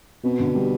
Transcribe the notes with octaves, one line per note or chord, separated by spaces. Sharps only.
B2 C4
D3
G3